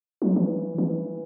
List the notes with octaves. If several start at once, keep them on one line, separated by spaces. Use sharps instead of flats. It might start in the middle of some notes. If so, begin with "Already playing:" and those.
F#3
E3
E3